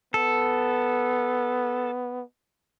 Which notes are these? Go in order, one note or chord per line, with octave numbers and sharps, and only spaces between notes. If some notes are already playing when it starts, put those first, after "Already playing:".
B3 A4